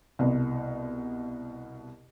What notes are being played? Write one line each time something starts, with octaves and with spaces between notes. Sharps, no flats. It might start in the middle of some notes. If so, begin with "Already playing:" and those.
C2 B2